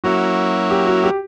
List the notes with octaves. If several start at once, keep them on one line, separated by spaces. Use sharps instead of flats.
F#3 A#3 C#4 E4 F#4
G4
F#4
G4